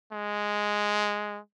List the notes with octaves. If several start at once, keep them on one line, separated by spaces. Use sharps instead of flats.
G#3